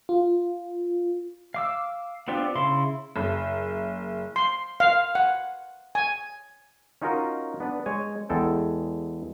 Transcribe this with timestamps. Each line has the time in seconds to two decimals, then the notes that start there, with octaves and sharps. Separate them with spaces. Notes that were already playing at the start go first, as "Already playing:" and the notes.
0.09 F4
1.54 F5 D6 E6
2.28 B3 C4 D4 F4 G4
2.55 C#3 E4 F5 C6
3.16 F#1
4.36 C6
4.80 F5
5.15 F#5
5.95 G#5
7.02 C#4 D#4 F4 F#4 A#4 D#5
7.60 B3 D4 B4
7.86 G#3 C#5 G#5
8.29 E2 G#3 A4 G5